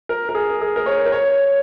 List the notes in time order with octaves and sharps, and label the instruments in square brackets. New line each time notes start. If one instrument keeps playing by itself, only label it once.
[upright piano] A#4
A#4
G#4
G#4
A#4
C#5
A#4
C#5